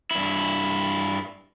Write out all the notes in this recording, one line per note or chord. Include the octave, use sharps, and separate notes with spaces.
G2 E4